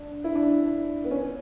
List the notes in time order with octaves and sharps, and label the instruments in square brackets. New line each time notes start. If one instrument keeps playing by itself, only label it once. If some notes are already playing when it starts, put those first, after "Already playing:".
Already playing: [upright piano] D4
E4
D4
B3
C#4